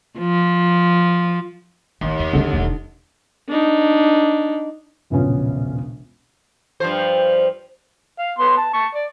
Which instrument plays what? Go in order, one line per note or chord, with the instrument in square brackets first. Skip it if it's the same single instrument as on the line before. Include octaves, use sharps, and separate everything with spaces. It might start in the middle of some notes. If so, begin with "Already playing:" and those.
[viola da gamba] F3
[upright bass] A1 [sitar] D#2
[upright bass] E2
[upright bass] C#2 C4 [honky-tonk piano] D3
[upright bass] E1 D#4
[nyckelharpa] D4 D#4
[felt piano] E1 A#1 C#3 B3 C#4 F4
[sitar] G2 F3 C5
[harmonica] F5
B3 C6
A5
A5 C#6
D5